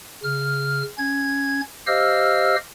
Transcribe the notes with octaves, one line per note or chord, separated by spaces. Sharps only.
C#3 F6
C#4 G#6
G4 C5 D#5 F5 E6 F6